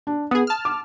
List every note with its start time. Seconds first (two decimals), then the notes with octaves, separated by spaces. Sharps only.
0.07 D4
0.31 B3 G#4 D#6
0.47 A5 F6
0.65 D6